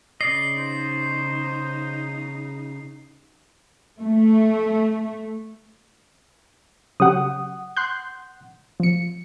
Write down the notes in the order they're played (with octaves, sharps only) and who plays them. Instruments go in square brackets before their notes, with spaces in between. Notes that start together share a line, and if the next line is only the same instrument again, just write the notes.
[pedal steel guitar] C#3 D5 D#5 [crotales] C7
[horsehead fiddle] D#4 [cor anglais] C5
[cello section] A3
[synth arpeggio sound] C#3 F#3 G4 [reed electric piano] F#5 D#6
[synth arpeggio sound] C6 F#6 G6
F3 C#7